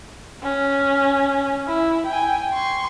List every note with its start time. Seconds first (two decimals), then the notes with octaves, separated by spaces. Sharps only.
0.43 C#4
1.67 E4
2.06 G5 G#5
2.53 C6 C#6